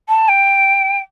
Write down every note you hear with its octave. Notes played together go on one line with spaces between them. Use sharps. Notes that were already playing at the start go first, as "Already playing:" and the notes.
A5
G5